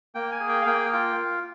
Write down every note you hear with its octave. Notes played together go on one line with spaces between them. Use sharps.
A#3 G5
G#5
G#4
G5
F5
A#3 G5
F4 G5